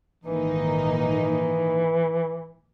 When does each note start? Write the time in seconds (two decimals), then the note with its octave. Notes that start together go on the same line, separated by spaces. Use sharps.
0.24 A#1 G#2 D#3 E3 A#3 D#4
0.98 E3